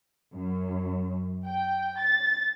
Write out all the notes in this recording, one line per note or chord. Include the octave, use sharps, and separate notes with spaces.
F#2
G5
A6